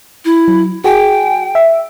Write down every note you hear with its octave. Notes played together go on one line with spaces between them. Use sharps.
E4
F#3
F#4 G#4 G5 G#5
E5